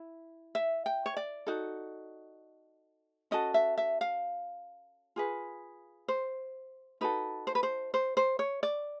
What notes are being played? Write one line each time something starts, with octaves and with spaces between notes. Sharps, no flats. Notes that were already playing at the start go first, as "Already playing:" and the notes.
Already playing: E4
E5
G5
C#5
D5
D#4 F#4 A4
C#4 F#4 A4 D#5
E5
E5
F5
F4 G#4 B4
C5
D#4 F#4 A4 B4
C5
B4
C5
C5
C5
C#5
D5